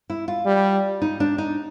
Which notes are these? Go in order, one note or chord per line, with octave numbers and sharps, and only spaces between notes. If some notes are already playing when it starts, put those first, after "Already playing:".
E4
F4
G3
D#4
D4
D#4